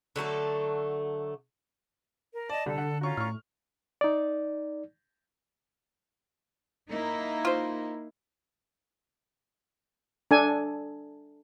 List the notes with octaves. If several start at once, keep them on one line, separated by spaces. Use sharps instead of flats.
D3 F#3 A3 A4
A#4
D5 D#5 A5
C2 D3 A4
F#5
C#4 F4 F#4 A#5 C#6
A2 C#6 F6
D#4 D5
A#3 D#4 E4
F4 C5
D4 A4 G#5